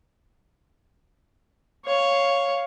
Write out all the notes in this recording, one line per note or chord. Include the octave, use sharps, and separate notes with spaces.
C#5 F5